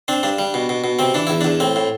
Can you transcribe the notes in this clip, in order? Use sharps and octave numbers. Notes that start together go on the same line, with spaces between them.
C4 D4
G2 D4
G3
B2
B2
B2
C3 C4
E3 D4
E2 E4
E2 D4
A2 C4
A2